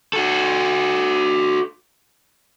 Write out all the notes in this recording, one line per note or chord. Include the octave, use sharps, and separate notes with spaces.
F#4 A4